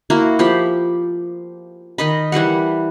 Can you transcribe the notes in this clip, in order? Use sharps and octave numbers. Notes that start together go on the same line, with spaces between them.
A#3 E4 F#4 A#4
F3 G4 B5
D#3 D#5 B5
E3 G3 B4 F#5